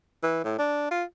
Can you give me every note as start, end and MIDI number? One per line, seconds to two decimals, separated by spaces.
0.23 0.43 52
0.44 0.54 45
0.58 0.90 62
0.91 1.04 65